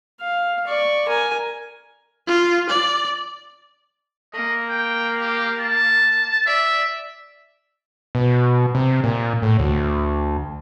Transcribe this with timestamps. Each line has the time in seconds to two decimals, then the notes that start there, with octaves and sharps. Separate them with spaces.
0.21 F5
0.67 D5 C#6
1.08 A#4 G#5
2.27 F4
2.69 D5
4.33 A#3 D#5
4.69 G5
5.20 G4
5.61 A5
6.46 D5 E5
8.15 B2
8.75 C3
9.04 A#2
9.42 A2
9.59 D2